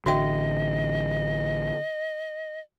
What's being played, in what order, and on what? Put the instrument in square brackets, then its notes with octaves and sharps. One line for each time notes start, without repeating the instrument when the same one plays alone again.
[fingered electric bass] A1 D3 [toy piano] F#4 E5 G5 [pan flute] D#5